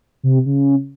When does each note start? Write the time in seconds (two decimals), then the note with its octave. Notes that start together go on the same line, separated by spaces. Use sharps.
0.23 C3
0.46 C#3